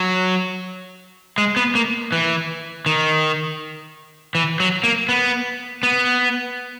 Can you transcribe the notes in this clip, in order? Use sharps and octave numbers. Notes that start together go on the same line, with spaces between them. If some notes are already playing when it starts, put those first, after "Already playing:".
Already playing: F#3
G#3
B3
A#3
E3
D#3
E3
F#3
A#3
B3
B3